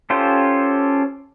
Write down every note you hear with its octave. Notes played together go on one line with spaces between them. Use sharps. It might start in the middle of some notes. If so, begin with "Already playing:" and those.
C#4 F4 G4 A4 C5